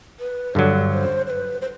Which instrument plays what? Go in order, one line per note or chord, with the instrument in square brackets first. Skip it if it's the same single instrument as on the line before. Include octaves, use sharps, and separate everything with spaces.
[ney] B4
[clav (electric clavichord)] G2 D3 F#3 [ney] D5
[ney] D5
C5
C5
B4
C5